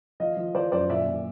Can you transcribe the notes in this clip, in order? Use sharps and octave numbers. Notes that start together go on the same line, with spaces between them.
F3 D#5 F5
F3
F3 C5 D5
F#2 C5 D5
A#2 D5 E5
A#2